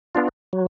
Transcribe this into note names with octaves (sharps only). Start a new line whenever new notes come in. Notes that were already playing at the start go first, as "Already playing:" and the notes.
B3 D4 F4
F#3